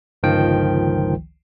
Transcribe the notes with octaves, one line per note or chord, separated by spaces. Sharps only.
G1 C#2 D#3 F3 G5